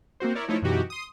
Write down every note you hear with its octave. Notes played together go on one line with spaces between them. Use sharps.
A#3 C4 F#4 C5
E4 A#4 C#5 D5
F3 A3 D#4 E4 C#5
F#2 B2 E3 D#4 F#4 G4
C6 D#6